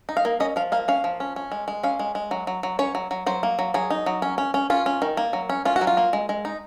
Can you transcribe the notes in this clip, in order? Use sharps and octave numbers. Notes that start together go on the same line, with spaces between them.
D#4
F5
A#3
C#4 D#5
F3 F5
A#3 F5
C#4 F5
F3
C#4
C#4
G#3
G#3
C#4 F5
G#3
G#3
F#3
F#3
F#3
C#4 C#5
F#3
F#3
F#3 C5
A#3
F#3
F#3 G#4
D#4
F#3
C#4
C#4
C#4
C#4 F4
C#4
D#3
A#3
F#3
C#4
C#4 F4
F#4
F#3
F4
A#3
G#3
G#3
D#4